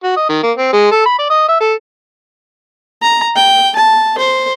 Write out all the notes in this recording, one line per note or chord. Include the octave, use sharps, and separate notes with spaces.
F#4
D#5
D#3
A#3
C4
G#3
A4
B5
D5
D#5
E5
A4
A#5
G5
A5
C5